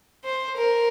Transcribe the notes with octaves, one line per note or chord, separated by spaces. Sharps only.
C5
A#4